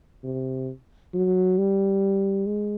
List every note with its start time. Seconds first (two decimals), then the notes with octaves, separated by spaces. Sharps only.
0.24 C3
1.14 F#3
1.58 G3
2.47 G#3